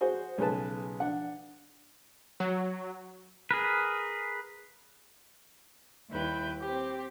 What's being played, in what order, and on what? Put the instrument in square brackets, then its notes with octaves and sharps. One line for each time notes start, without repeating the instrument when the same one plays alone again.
[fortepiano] F#4 G#4 C5
B1 C#3 G#4 B4 A5
D4 F#5
[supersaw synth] F#3
[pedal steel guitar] G#4 A#4 B4
[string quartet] D#2 G3 E4 B4 G5 G6
C4 G4